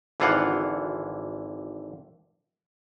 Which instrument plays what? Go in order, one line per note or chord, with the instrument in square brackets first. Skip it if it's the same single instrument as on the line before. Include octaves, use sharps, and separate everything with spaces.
[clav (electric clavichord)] G#1 D3 E3 F4 F5 F#5